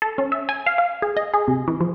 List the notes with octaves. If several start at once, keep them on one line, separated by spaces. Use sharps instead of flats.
A4
C#4
E5
G#5
F5
F5
G#4
D#5
G#4
C3
E3
F3